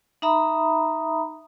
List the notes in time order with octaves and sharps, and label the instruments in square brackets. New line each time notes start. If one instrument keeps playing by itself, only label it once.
[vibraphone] D#4 E5 A#5 B5 D#6